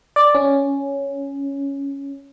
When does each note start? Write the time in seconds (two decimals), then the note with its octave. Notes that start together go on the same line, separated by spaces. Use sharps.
0.16 D5
0.34 C#4